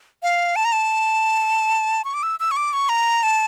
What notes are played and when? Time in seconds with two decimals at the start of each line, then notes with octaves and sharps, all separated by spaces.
0.23 F5
0.56 A5
0.65 A#5
0.72 A5
2.05 C#6
2.14 D6
2.23 E6
2.40 E6
2.51 C#6
2.56 D6
2.73 C#6
2.89 A#5
3.23 A5